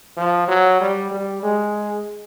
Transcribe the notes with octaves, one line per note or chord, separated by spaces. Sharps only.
F3
F#3
G3
G3
G#3